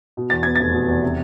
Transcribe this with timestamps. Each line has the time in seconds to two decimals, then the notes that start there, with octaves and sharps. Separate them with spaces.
0.17 B2
0.30 E2 A6
0.43 B3 G#6
0.55 F1 A6
0.74 B2
0.88 E2
1.03 C3